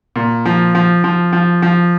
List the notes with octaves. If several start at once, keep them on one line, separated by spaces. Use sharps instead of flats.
A#2
F3
F3
F3
F3
F3